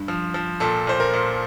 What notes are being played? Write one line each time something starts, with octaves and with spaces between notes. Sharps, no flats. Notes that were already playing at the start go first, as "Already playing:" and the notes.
Already playing: G2
F3
F3
A#2 A4
A#2 C5
A#4
A#2